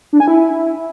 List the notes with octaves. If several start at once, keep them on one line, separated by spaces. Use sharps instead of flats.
D4
G#5
E4